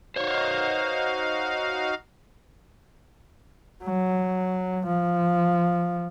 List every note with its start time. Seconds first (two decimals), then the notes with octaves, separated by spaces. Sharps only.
0.16 D#4 F#4 C5 C#5 F5
3.84 F#3
4.86 F3